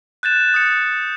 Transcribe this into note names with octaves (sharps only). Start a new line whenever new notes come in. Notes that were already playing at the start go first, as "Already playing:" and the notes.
F#6 G6 A6 E7
D#6 C#7